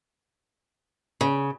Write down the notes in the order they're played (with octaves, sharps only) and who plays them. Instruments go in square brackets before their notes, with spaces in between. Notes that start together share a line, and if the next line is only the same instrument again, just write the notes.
[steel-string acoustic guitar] C#3